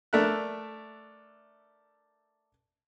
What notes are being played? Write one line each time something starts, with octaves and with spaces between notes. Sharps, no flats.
A3 D4 A#4 E5 F#6